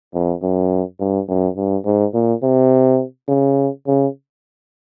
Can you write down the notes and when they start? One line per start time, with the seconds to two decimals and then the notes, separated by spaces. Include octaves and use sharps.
0.14 F2
0.42 F#2
1.00 G2
1.28 F#2
1.57 G2
1.85 G#2
2.14 A#2
2.43 C3
3.29 C#3
3.87 C#3